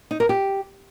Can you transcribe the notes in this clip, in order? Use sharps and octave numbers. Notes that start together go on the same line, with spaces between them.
D#4
A#4
G4